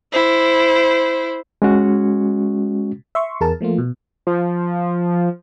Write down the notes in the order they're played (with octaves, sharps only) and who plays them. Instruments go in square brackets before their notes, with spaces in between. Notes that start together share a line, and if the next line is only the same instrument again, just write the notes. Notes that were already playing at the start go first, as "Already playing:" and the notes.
[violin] E4 C5
[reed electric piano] G#3 C#4 F#4
[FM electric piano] E5 C6 C#6
E2 G#4 A#4 A5
F3 A3 A#3 F4
B2
[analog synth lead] F3